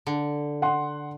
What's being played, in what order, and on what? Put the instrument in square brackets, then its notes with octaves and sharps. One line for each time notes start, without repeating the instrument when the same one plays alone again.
[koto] D3
[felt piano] F#5 C6